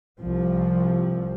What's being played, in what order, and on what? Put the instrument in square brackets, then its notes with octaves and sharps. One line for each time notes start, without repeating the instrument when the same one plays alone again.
[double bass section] C2 F3